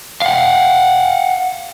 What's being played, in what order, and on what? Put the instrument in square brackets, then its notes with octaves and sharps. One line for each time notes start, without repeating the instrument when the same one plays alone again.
[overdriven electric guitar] F5 F#5